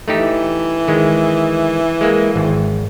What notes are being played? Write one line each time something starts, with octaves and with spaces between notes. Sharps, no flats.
E3 A3 D#4 G4
D#3 G#3
G#3 A#3
G#1